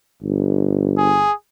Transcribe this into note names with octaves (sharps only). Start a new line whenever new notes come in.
G1
G#4